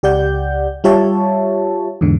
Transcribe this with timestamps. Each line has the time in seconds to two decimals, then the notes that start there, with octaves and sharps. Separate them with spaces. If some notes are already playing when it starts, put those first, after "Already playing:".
0.03 C#2 G4 D5 F#5 G6
0.84 G3 F4 G4 C#5 E5 A5
2.01 E2 G#2 D3